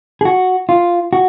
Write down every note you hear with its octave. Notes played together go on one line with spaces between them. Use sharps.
G#4
F#4
F4
F#4